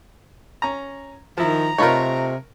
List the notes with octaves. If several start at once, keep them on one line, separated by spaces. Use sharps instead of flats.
C#4 A#5
D#3 F3 E4 A#5
C3 A3 D#4 F4 A#4 B4 C#5